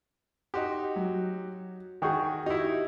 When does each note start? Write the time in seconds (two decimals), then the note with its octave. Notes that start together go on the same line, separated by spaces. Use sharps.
0.54 D#4 F#4 G4 C6
0.96 F#3
2.02 D#3 F#4 G#4 G5 C#6 G6
2.46 D#4 E4 F#4 G4